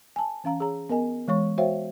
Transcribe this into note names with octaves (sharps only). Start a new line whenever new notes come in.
G#5 A5
E3 C#4 F5 A#5
G#4 C#5 A#5
B3 A#4 D#5 G#5
E3 G#3 C#5 C#6
F#4 C5 C#5 E5 F5 G5